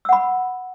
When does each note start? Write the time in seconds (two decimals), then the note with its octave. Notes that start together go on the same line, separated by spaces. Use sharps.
0.05 E6
0.09 F#5
0.13 B5